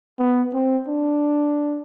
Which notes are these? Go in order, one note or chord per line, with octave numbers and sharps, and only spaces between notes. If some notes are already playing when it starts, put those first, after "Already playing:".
B3
C4
D4